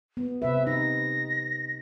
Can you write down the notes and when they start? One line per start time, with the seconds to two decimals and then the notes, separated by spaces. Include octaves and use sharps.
0.17 B3
0.42 C3 C4 B4 E5
0.67 D#4 A#6